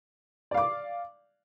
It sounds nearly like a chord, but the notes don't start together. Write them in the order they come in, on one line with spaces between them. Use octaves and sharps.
D5 F5 D6